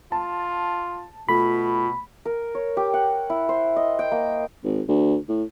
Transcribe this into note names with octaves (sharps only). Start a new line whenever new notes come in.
F4 A5
B2 A3 F4 B5
A#4
C#5
G4
F#5
E4
C5
D#5
G5
A#3
G#1
D2
A2